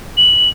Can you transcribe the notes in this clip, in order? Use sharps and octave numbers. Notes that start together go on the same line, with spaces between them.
F#7